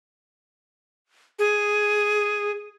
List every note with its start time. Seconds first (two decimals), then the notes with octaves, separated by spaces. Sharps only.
1.39 G#4